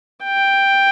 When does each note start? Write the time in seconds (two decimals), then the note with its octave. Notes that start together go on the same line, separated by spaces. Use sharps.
0.24 G5